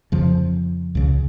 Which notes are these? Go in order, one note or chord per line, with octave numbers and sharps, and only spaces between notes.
F2 C#3 F3
C#2 C#3